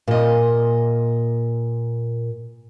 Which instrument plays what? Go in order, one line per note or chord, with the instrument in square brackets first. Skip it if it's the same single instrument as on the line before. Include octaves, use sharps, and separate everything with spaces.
[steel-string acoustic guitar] A#2 D#5